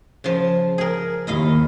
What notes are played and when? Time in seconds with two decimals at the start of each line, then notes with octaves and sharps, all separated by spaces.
0.24 C#3 F3
0.78 G#4 A#4
1.27 D#2 E4 D#5 F5